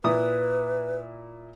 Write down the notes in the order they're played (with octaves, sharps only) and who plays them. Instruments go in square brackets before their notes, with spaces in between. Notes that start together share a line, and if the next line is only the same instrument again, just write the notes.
[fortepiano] A#2 E4 D#6 [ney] B4